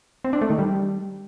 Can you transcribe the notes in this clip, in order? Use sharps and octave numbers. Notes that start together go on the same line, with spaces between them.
C4
D4
A3
D#3
G3